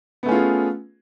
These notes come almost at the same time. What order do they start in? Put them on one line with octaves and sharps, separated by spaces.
B3 A3 C#4 F4 G#4